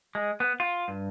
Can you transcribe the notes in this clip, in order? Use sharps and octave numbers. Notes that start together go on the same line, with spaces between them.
G#3
B3
F4
G2